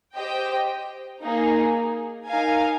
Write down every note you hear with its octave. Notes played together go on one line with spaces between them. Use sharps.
G4 C5 D#5 G5
A#3 D#4 G#4
D#4 A#4 F5 G#5